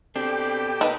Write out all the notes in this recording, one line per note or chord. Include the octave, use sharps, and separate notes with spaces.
B2 C4 D4 G4 A4
D#4 A#4 B4 A5